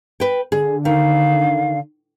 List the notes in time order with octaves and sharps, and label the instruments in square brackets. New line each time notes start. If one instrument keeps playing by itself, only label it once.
[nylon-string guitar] B4 G5
[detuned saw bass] D3 [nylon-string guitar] G#4
[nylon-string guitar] D#3 [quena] F5